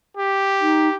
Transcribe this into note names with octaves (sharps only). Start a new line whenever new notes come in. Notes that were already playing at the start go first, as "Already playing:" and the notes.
G4
D#4